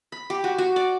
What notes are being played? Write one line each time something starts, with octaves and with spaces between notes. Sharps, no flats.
B5
G4
F#4
F#4
D5